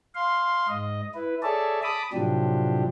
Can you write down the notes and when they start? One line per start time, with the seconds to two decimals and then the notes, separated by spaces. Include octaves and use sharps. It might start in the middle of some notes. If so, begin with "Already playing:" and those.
0.15 F5 C6
0.68 G#2 D#5
1.15 E4 B4
1.43 G#4 A4 C#5 D5 E5 A5
1.83 A5 B5 D6 D#6
2.13 A2 C3 F3 F#3 D4 G4